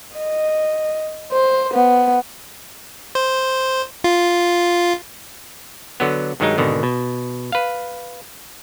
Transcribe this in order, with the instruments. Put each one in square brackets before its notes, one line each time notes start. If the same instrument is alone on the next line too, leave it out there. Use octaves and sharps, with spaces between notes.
[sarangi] D#5
C5
B3
[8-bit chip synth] C5
F4
[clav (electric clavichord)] D3 F#3 B3
G2 D#3 F#3 G#3 D#4
G#1 B2 D3 D#3
B2
B4 F5